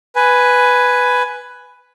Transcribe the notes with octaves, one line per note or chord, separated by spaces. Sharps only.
B4 G#5